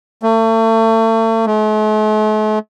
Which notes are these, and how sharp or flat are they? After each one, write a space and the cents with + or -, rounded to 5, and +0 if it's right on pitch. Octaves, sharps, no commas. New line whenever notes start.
A3 +35
A3 -45